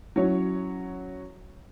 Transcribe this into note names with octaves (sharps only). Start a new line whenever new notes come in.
F#3 C#4 E4 C#5